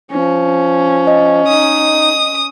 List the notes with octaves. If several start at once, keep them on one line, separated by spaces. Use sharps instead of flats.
F3 C#4
D#5
D#4 D#6